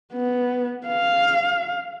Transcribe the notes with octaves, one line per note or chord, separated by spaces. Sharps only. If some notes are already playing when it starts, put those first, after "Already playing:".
B3
F5